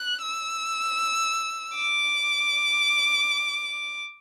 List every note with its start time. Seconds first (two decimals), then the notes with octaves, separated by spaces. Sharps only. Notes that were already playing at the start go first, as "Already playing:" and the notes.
Already playing: F#6
0.22 E6
1.75 D6